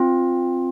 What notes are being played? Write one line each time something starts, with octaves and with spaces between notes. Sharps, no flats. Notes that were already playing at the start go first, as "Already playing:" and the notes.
Already playing: C4 F4